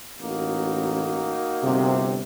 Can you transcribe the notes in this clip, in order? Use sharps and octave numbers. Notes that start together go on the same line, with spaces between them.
A1 A#3 D#4 F#4
G1 C3